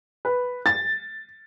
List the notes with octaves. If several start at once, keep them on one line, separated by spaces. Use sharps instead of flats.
B4
A6